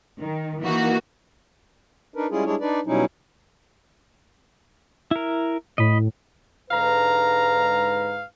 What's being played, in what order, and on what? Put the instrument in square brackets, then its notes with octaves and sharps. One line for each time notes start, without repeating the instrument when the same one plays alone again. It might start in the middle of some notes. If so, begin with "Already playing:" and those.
[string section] D#3
E3 A#3 D#4 F#4
[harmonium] D4 D#4 A#4 B4
G3 G#3 C#4 E4 F4 G#4
G3 G#3 D4 E4 G#4 C#5
D4 D#4 B4 D5
B2 F#3 G3 C#4 D#4 E4
[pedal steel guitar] E4 A#4
[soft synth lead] A2 [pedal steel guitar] D#5 B5
[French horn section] G#2 B4 [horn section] D3 A#5 [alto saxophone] F5